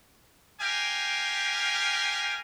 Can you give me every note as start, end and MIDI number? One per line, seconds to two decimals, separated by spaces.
0.61 2.39 67
0.61 2.39 70
0.61 2.39 77
0.61 2.39 79
0.61 2.39 80